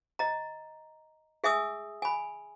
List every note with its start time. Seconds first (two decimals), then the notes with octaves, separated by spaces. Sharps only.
0.19 D#5 A#5
1.44 G#4 E5 G#5 D#6 E6
2.02 G#5 B5